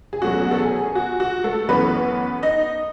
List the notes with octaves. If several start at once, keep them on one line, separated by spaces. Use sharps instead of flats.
G#4
E2 B2 F#3 A3 C#4 F#4
A4
G#4
F#4
F#4
A3 A4
F#2 E3 A3 B3 C#4 B4
D#4 D#5